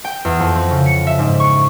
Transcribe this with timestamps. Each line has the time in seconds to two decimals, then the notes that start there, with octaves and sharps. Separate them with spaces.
0.04 G5
0.25 E2
0.40 F2
0.55 C4
0.71 C#3
0.86 C#7
1.07 E5
1.19 G#2
1.40 C#6